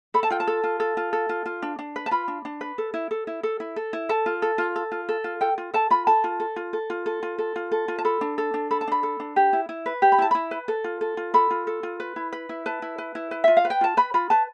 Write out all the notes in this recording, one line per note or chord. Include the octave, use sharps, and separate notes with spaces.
A4 B5
A5
F4 G5
A5
A4
F4
A4
F4
A4
F4
F4
D4
D4
B4
A5
F4 B5
D4
D4
B4
A4
E4
A4
E4
A4
E4
A4
E4
A4 A5
F4
A4
F4
A4
F4
A4
F4
A4 G5
F4
A4 A5
F4 B5
A4 A5
F4
A4
F4
A4
F4
A4
F4
A4
F4
A4
F4
A5
A4 B5
D4
A4
D4
A4 B5
A5
D4 B5
A4
D4
G4
E4
E4
B4
G4
B5
E4 A5
E4 B5
B4
A4
F4
A4
F4
A4 B5
F4
A4
F4
B4
E4
B4
E4
B4 A5
E4
B4
E4
B4
F4 E5
F5
B4
G5
F4 A5
B4 B5
F4 B5
B4 A5